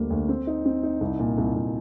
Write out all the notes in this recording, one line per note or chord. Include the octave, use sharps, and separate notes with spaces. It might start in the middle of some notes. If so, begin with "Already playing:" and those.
Already playing: D2 G3 A#3
D2
C4
D#4
C4
D#4
C2
A#2
C2
C2